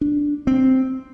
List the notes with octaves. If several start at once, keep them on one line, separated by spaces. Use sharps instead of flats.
D4
C4